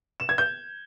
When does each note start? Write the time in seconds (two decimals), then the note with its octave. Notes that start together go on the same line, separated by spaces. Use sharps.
0.20 E7
0.29 G#6
0.38 G6